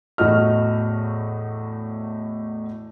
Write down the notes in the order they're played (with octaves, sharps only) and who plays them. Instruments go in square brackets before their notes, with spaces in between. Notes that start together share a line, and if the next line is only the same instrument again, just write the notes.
[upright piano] E2 A2 A3 F#4 D#5 F6